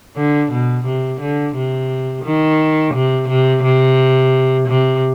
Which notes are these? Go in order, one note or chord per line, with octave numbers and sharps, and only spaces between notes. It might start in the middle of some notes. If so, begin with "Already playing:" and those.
D3
B2
C3
D3
C3
D#3
C3
C3
C3
C3